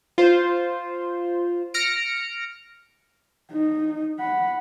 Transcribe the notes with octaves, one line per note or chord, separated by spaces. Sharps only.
F4 C5
F6 A#6 C#7 D7
D#4
F#5 B5